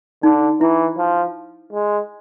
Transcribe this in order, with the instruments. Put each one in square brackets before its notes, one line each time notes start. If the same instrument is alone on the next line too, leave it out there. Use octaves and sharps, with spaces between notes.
[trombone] D3 [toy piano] D#4
[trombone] E3 [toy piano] E4
[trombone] F3
G#3